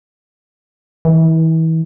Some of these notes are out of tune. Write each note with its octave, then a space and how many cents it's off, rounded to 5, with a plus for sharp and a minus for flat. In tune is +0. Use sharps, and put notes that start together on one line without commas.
E3 -35